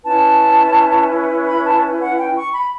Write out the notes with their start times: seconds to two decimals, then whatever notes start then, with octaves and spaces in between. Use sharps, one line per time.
0.04 C#4 E4 B4 A5
1.47 B5
1.64 A5
2.00 F#5
2.18 G5
2.36 C#6
2.53 B5